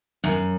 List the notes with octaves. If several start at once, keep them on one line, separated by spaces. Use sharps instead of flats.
F#2